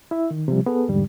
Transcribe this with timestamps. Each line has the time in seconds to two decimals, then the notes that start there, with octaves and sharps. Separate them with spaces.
0.11 E4 E5
0.31 D#3
0.48 C3 F3 G3
0.66 B3 G#4 A4
0.88 E2 G#2 D3 G3